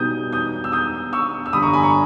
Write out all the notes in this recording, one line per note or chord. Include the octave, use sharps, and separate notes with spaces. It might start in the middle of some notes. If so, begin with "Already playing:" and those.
Already playing: B1 B2 G3 B3 D#4 D#6 G6
D#6 G6
E6
D#6 G6
C#6 E6
E6
G1 G2 G3 B5 D#6
A#5 C#6
G#5 B5
A#5 C#6